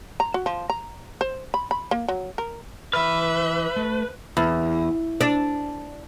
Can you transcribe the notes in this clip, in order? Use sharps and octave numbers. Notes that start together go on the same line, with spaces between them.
A#5
F#4
F3
A#5
C5
B5
B5
A#3
F#3
A#4
E3 B4 E5 F6
A3
E2
D4